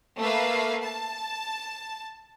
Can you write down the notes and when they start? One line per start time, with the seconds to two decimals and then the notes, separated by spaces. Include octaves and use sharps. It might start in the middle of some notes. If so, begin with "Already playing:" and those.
0.18 A3 A#3 B4 E5 F5
0.84 A5